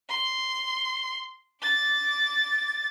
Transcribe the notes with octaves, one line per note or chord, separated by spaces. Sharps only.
C6
D6 A6